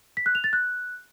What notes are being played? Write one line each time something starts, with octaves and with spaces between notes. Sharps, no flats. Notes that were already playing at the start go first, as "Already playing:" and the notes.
B6
F#6
F7
A6
F#6